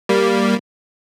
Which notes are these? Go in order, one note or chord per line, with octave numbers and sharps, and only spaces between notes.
G3 A#3